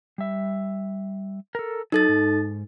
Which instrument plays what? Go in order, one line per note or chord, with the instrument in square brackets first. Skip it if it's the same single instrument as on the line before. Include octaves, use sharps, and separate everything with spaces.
[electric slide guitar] G3 E5
A4 A#4
[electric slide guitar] F#3 [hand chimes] D#4 A4 A6
[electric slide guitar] G#2